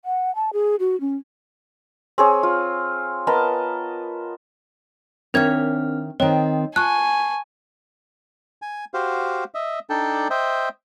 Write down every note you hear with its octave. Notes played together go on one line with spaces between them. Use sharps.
F#5
A5
G#4
F#4
C#4
C4 G#4 C#5
F4
B3 A#4 D#5 A5
D#3 C4 D4 A#4 C#5 E5 F6 G#6
D#3 C4 C#5 D#5
F4 G#5 A5 C#6 F#6
G#5
F#4 G4 C5 F5
D#5 E5
D4 D#4 A4 D5 G5
C5 D#5 E5 G5